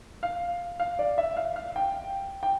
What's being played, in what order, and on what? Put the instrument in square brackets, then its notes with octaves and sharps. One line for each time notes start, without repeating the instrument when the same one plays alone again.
[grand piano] F5
F5
D5
E5
F5
F5
G5
G5